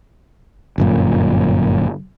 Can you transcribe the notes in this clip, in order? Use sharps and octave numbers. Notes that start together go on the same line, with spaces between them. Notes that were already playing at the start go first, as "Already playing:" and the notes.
G1 F#2 A#2